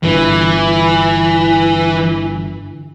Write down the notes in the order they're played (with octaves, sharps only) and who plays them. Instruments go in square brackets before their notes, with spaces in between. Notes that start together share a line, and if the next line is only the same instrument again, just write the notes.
[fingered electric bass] G1 [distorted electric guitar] E3